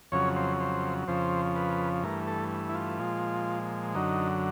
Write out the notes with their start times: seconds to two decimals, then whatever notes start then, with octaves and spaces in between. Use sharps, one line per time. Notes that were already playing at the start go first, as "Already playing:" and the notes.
0.12 F2 C#3 F#3 C#5
0.36 C5
0.60 C5
1.08 F2 C#3 F3 C5
1.56 B4
2.03 G2 E3 A3 A#4
2.28 A4
2.69 E4
2.75 F4
2.99 A#2 F3 G#3
3.95 F#2 D3 F#3 D#4